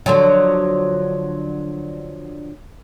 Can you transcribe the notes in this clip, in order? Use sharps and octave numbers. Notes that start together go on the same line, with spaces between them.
D3 F3 F#3